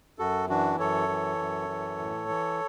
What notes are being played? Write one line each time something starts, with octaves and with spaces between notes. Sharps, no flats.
F#2 F#4 A4
E3 D4 F#4
F#2 A4 C#5
E3
F#2
E3
A2
E3